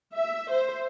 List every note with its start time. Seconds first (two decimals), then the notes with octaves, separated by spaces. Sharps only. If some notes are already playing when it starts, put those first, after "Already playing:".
0.16 E5
0.51 C5